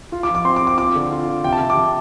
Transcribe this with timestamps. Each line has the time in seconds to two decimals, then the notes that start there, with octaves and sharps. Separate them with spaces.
0.12 F4
0.23 D6
0.29 F3
0.35 D6
0.45 C4 C6
0.56 D6
0.62 C4
0.67 D6
0.78 F4 D6
0.95 D3
1.11 F4
1.28 F4
1.44 C3 G5
1.53 A5
1.61 C3
1.70 D6
1.77 C3